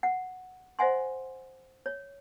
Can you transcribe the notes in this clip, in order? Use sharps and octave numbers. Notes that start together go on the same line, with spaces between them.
F#5
C5 D#5 E5 F#5 G#5 C6
C#5